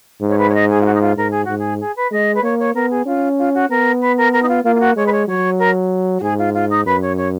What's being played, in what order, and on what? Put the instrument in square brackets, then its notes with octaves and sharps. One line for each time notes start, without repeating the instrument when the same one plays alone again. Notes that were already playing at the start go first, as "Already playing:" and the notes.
[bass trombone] G#2
[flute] C#5
B4
C#5
D#5
G#4
F4
F#4
D#4
F4
[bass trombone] G#2 [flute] A#4
[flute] G#4
[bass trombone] G#2 [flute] F#4
[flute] G#4
G#4
B4
[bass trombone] G#3 [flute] D#5
[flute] B4
[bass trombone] A#3 [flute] C#5
[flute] C#5
[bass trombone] B3 [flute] A#4
[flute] G#4
[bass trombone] C#4 [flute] F4
[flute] F4
F#4
[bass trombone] B3 [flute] A#4
[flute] B4
A#4
A#4
D#4
F4
[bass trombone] A#3 [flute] F4
[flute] F4
F#4
[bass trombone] G#3 [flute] C#5
[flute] B4
C#5
[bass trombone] F#3 [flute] C#5
[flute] A#4
F#4
[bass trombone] G#2 [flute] G#4
[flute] F4
F4
D#4
[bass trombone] F#2 [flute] B4
[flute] C#5
C#5